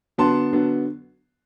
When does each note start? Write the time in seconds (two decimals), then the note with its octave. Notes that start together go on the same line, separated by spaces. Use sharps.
0.18 D3 F#3 B3 A5 C6
0.52 D3 F#3 B3